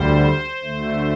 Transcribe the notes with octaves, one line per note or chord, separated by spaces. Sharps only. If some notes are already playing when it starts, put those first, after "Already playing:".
Already playing: D2 D3 G3 C5
D2 D3 A3